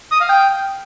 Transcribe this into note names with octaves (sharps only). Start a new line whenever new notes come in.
D#6
F5
G5